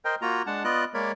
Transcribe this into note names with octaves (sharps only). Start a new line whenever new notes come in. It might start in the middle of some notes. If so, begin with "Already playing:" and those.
A#4 C5 D#5 G5
A#3 F4 F#4 A#5
G#3 D4 F#5 A5
B3 F4 D5 D#5 F#6
G#3 A#3 A#4 C#5 D5 B5